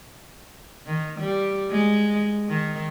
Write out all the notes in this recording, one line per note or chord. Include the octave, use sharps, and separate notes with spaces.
D#3
G3
G#3
D#3